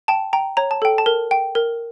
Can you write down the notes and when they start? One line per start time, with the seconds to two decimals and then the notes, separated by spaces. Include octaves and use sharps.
0.08 G5 A5
0.33 G5 A#5
0.57 C#5 A#5
0.71 A5
0.82 A4 G5
0.98 A5
1.06 A#4
1.31 G5
1.55 A#4